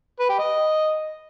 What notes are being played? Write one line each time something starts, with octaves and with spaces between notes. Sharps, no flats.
B4
G4
D#5